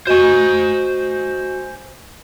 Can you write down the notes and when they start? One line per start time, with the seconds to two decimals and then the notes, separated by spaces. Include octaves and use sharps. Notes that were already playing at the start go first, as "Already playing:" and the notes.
0.07 F#4 C5 D#5 G#5 C#6